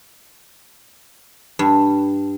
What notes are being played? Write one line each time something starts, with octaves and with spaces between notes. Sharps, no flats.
G2